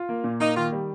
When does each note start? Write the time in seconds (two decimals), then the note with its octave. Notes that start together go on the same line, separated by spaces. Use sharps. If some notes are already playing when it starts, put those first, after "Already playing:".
Already playing: F4
0.09 A#3
0.24 A#2
0.40 A#3 D#4
0.56 D#3 F4
0.72 G3